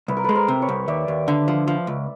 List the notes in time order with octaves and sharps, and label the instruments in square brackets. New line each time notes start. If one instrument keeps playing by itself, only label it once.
[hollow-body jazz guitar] C2 [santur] B4
[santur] A#4
[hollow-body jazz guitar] G#3 [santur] A4 B4
[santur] A#4 C5
[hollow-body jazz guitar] C3
[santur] B4 C#5
[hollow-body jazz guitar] C2
[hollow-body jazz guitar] D#2 [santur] D5 E5
[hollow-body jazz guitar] D#2
D3
F3
F3
C#2